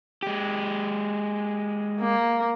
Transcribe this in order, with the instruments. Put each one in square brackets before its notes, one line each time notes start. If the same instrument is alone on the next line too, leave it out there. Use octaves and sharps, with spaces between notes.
[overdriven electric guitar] G#3 G4
[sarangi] A#3